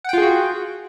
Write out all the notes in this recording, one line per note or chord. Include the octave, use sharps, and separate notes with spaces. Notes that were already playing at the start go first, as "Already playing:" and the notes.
F4 F#4 G#4 F#5 G5